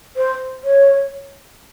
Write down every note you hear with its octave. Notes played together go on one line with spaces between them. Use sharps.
C5
C#5